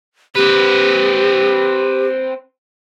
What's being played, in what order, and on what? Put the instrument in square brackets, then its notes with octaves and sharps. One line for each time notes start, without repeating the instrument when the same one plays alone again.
[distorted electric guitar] C4 B4 [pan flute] G4